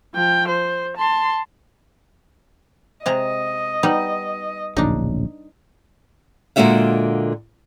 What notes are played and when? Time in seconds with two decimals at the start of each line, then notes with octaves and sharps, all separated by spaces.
0.14 F3 G5
0.48 C5
0.97 A5 C6
3.06 C3 G#3 D#5 A#5
3.83 G3 B3 D#4
4.77 D1 A#1 C#3 D4 D#4
6.56 A#2 D3 G#3 F#4 E5 F5